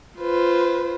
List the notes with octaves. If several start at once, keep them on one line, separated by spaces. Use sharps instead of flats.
F4 B4 C5